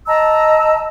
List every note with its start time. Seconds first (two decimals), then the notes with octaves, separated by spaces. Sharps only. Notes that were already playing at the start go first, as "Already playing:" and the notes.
0.06 D#5 A5 A#5 E6